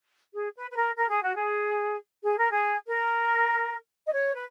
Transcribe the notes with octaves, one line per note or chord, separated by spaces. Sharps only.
G#4
B4
B4
A#4
A#4
G#4
F#4
G#4
G#4
A#4
G#4
A#4
D#5
C#5
B4